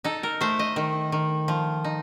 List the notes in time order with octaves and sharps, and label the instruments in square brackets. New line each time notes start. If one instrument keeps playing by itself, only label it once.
[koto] D#4 A4
A#4
A3 C5
D#5
D#3
D#3
F3
D#4